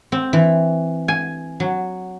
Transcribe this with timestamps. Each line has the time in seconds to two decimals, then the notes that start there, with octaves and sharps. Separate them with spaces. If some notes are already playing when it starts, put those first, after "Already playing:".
0.12 C4
0.33 E3
1.08 G#5
1.60 F#3